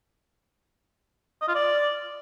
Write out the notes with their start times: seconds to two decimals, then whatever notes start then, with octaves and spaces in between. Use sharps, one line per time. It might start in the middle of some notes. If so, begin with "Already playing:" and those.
1.42 D#5
1.48 F4
1.55 D5